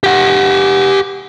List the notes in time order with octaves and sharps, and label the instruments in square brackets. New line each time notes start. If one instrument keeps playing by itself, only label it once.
[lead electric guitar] G4 F#5